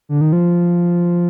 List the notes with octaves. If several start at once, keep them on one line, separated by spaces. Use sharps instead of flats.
D3
D#3
F3